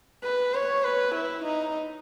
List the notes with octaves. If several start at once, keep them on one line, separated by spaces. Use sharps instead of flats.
B4
C#5
B4
E4
D#4